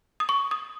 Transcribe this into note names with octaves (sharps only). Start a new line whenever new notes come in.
D#6
C#6
D#6